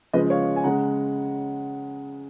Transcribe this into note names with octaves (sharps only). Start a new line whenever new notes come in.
C#3 F3 G#3 B4 D#5
C#5 F5
G#5
C#3 G#3 F#5 A#5